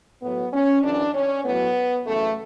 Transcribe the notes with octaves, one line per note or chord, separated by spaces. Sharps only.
A2 F#3 B3
C#4
F#2 C#3 E3 D4
C#4
A2 F#3 B3
F#2 C#3 E3 A3